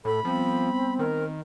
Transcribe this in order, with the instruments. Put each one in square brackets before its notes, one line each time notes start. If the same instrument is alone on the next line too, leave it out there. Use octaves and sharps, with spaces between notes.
[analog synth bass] A2 [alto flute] A4 [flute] B5
[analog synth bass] F3 [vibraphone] G3 B3 [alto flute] C4
[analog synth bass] D#3 [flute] A#4